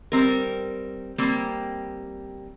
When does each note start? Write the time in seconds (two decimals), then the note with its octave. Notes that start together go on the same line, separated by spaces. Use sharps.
0.12 G3 C4 A#4
1.18 G3 A#3 C4